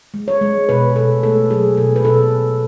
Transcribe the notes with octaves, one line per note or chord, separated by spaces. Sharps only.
G#3
C#5
G#3
B2 B4
B2 A4
A3 A4
F#3 G#4
B2 A4
B4
B2 A4